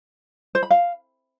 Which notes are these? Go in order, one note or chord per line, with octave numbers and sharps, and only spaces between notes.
C5
B5
F5